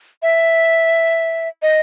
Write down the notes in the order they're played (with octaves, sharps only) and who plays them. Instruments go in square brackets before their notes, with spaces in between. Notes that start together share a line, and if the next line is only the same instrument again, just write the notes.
[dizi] E5
D#5